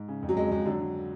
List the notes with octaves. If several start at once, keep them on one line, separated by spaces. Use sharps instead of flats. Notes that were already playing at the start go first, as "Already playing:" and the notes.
Already playing: G#2
C#3
F2
F#3
F2 G#3
F2 G#3
D3 F#3
D3